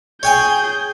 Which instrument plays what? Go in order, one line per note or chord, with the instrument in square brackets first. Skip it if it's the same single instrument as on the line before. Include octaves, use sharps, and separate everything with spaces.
[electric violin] G#4 G6 [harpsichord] C#5 G5 G#5